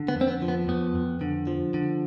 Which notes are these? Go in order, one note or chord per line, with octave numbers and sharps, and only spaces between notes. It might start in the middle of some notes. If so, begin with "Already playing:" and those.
Already playing: D3
B3
F2
C4
B3
F3
B3
F2 B3
F2
D3
F3
D3